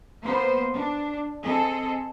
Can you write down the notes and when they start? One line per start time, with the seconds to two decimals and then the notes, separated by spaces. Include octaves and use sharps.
0.22 A#3 B3 C5
0.72 D4
1.42 C4 G#4 A4 D#5